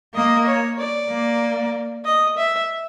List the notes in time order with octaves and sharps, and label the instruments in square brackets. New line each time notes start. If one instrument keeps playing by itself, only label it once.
[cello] A#3 [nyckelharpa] D#5
[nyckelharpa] C#5
D5
[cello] A#3
[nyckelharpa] D#5
E5